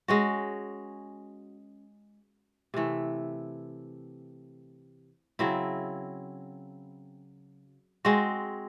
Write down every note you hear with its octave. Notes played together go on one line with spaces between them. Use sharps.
G#3 C#4 F#4
C3 E3 A3
C#3 F#3 C4 E4
G#3 C4 F#4